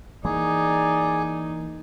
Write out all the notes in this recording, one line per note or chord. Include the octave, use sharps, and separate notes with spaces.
E3 A#3 D#4 G#4 D5